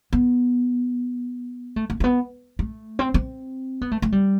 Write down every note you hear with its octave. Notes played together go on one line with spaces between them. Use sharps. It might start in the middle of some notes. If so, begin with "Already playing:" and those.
B3
A3
A3
A3
B3
A3
C4
C4
B3
A3
A3
G3